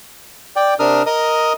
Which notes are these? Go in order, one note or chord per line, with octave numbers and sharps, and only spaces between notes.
D5 G5
C3 D4 A#4 D#6 F6
A#4 D#5 D#6